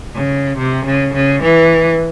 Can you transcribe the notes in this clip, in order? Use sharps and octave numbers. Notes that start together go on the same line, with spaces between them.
C#3
C3
C#3
C#3
E3